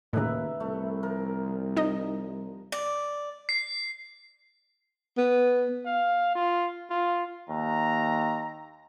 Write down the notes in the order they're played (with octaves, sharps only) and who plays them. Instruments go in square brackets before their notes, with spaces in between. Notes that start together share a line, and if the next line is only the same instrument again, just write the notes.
[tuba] D#2 [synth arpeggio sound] A2 C#3 [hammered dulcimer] B4 E5 A#5
[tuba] C2 [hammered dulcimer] A3
[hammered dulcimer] F3 A#4
[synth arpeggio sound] D#4 D#5
[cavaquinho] D5
[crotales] C7
[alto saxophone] B3
[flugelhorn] F5
F4
F4
[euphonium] D#2 [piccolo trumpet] A#5